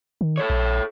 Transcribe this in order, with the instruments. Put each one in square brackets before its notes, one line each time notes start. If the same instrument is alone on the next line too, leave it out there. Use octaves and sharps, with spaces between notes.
[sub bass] D#3
[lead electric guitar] A4 C#5
[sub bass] A#1